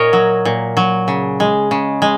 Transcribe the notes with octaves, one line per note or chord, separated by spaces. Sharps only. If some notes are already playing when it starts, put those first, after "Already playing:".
Already playing: A#2 A#4 C#5 D#5
F#3
A#2
F#3
C#3
G#3
C#3
G#3